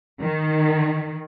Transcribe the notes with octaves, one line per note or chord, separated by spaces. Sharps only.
D#3